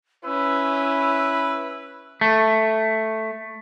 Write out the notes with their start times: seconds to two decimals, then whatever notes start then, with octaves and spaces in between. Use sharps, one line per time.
0.25 C#4 E4 B4 E6
2.21 A3